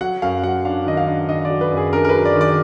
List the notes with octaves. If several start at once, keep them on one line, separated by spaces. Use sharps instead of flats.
F#3 F#5
F#2 F5
F#3 F#5
D4 F5
D#3 D#5
F5
D4
D#3 D#5
D5
F#3
B4
F#2
G#4
D4 A#4
A#4
B4
F#3
D5
D#3
D5